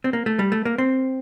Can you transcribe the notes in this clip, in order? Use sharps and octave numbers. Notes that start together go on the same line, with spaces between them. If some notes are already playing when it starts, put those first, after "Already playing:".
C4
A#3
A3
G3
A3
A#3
C4